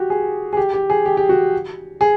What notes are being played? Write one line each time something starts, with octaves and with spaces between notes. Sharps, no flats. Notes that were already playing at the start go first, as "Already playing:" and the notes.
Already playing: F#4 G4
G#4
G#4
G4
G4
G#4
G4
G4
F#4
G#4